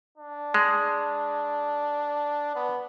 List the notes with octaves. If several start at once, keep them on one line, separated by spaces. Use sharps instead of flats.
D4
G#3
B3